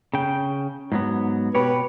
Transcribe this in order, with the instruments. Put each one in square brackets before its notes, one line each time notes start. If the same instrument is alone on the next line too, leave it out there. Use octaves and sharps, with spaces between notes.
[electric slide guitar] C#3 G5
G#2 F#3 B3
[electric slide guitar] B2 G4 C#5 [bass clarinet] B4